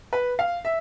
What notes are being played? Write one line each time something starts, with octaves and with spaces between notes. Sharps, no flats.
B4
F5
E5